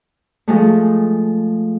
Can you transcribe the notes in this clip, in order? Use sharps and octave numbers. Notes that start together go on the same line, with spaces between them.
F3 G#3 A3